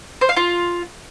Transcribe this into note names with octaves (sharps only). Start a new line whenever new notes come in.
C5
F5
F4